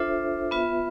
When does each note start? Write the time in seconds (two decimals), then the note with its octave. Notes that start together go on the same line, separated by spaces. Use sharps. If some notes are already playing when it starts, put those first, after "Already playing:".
Already playing: D4 F4 A4 C5 E5
0.51 B3 F4 B4 E5